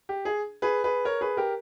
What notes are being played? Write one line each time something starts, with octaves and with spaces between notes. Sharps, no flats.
G4
G#4
G#4 B4
G#4 B4
A#4 C#5
G#4 B4
G4 A#4